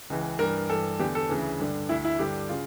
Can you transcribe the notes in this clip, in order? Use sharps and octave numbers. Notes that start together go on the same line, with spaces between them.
C#2 C#3 E3
G2 E3 A#4
G2 E3 A4
E2 D3 G4
A4
D2 C#3 E3
G2 D3
D2 D3 E4
E4
G2 D3 G4
C#3 F4